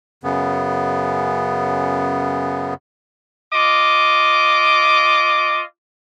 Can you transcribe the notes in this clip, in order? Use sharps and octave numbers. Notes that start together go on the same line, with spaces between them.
F#2 C#3 B3
F4 D#5 D6